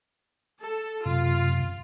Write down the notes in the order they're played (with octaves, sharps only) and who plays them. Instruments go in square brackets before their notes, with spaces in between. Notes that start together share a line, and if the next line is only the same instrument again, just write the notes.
[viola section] A4
[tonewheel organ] F#2 C3 [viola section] F4